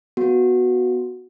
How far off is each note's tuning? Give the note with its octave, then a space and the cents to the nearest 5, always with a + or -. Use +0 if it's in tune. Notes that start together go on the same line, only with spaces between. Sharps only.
B3 +0 F#4 -5